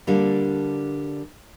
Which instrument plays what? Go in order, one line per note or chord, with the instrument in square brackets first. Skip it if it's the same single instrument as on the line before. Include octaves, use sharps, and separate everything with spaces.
[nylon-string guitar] D3 G3 A#3 D4